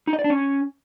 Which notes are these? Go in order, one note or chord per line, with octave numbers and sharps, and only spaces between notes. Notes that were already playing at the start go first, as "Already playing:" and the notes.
D#4
D#5
D5
D4
C#4